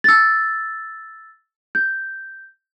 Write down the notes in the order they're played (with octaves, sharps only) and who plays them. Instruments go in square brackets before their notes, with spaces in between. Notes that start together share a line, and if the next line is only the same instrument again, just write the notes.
[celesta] E6 A6
G6